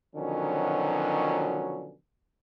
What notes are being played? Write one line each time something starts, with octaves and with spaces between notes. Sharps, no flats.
B2 D3 D#3 F3 F#3 C#4